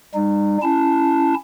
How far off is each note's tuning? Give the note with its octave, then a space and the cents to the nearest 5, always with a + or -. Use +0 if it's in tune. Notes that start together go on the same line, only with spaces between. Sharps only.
G3 +35 D#4 -30
C#4 +0 E4 +10 A5 +0